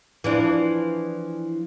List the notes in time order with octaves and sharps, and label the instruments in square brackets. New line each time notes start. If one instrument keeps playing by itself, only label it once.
[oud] E3 F3 D4